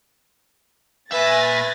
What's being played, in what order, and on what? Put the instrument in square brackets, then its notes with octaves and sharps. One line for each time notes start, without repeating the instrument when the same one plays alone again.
[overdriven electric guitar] A#2 E5 [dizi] B4 [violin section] G#5 A6 A#6